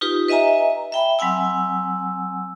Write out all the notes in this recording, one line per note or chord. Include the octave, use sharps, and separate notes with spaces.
D#4 F4 G4 B4
B4 D#5 E5 G#5 A#5
E5 G5 B5
F#3 C4 F#5 G#5 E6